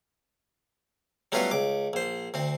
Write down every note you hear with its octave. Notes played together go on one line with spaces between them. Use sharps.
F#3 G3 A3 B3 C#4 F4
C#2 D6
A#1 C5
D2 C4